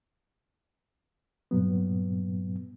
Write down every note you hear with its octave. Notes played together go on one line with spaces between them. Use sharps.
G2 A#2 F#3 B3